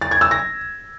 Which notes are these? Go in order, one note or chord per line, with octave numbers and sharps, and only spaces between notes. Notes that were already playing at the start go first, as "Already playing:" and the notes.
A6
G#6
E6
A#6